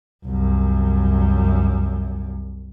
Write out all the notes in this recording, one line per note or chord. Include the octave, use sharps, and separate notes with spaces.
C2 F#2